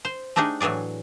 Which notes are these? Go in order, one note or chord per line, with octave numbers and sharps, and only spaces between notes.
C5
A3 D4 D#4 G4 G#4
A2 E3 F#3 G#4 D5